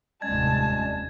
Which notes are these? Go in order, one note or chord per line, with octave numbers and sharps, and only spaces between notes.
F1 D#2 A2 G3 G#3 C#4 A5 G#6